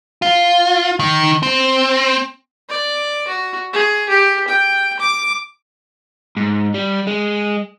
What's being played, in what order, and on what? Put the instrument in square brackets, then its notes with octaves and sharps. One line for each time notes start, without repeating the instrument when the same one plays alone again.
[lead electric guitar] F4
D#3
C4
[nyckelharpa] D5
F#4
G#4
G4
G5
D6
[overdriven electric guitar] G#2
G3
G#3